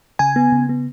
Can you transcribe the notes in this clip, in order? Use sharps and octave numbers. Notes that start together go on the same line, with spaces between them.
C#3 G#5
B3
C#3
B3